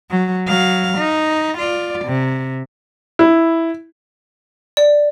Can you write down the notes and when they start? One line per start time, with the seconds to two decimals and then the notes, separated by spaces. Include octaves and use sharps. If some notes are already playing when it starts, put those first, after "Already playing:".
0.10 F#3
0.47 F#3 F5
0.98 D#4
1.58 F4 D5
2.05 C3
3.19 E4
4.77 D5